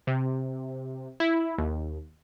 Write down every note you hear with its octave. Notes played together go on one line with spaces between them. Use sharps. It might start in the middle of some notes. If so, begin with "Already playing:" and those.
C3
E4
D#2